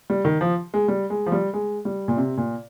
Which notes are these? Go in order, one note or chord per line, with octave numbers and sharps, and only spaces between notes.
G3
D#3
F3
G#3
G3
G#3
F3
G3
G#3
G3
A#2
C3
A#2